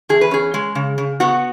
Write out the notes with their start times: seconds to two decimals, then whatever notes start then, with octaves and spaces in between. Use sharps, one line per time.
0.09 E2 G#4
0.21 B4
0.31 C#4 G#4
0.54 G#3
0.75 C#3
0.98 C#3
1.20 B3 F#4